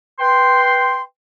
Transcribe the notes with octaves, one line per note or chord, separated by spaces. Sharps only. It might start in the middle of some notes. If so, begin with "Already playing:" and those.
B4 G5 C6